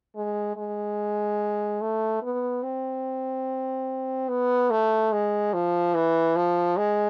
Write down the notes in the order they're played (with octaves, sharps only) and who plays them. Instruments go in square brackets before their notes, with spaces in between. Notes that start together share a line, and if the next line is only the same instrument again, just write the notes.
[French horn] G#3
G#3
A3
B3
C4
B3
A3
G#3
F3
E3
F3
G#3